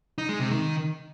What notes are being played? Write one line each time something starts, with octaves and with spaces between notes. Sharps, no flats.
D#4
G#3
C3
D#3